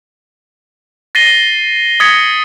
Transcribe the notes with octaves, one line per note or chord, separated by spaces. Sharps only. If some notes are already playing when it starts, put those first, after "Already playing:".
A6 A#6 C7 D#7 G7
D#6 G#6 A6 B6 C#7